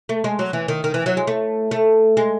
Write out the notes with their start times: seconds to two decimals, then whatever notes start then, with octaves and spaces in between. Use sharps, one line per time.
0.09 A3
0.24 G#3
0.39 F#3
0.53 E3
0.68 D#3
0.84 D#3
0.94 E3
1.06 F#3
1.17 G#3
1.27 A3
1.71 A3
2.17 G#3